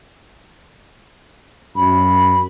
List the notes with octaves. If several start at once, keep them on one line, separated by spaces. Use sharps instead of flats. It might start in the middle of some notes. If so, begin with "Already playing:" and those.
F#2 B5